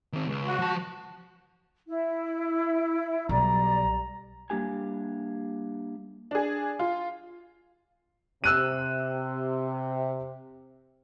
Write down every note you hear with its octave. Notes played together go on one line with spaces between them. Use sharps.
D#3 C4
C#2
F#4
F3 A5
E4
B1 G3 D5 A#5
G3 A#3 D4 G4 G#5
D4 G#4
F4
C3 E6 F#6 D#7